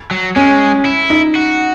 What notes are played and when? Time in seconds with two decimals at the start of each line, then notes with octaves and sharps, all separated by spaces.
0.11 F#3
0.36 G#3 C#4
0.85 E4
1.10 D#4
1.35 F#4